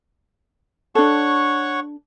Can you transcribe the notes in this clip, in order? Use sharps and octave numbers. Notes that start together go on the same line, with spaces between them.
D4 A4 C#5 F#5 C#6